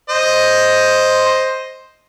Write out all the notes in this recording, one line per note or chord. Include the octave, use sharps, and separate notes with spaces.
C5 D#5